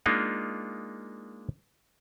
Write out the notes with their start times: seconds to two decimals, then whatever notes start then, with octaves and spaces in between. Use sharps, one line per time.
0.06 G#3 A#3 D4 D#4 F4